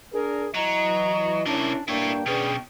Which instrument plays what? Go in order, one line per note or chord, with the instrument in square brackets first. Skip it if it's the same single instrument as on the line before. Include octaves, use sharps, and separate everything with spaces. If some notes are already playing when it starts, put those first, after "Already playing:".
[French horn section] D4 A#4 [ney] G#4
[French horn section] E3 D#5 [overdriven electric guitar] F#3 [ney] A#5
[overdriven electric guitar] C3 A#4 [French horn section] C#4 E4 [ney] D4
[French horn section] G2 A#3 D4 [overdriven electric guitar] E4 C#5 [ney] G5
[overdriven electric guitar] B2 C#4 [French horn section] D4 G#4 B4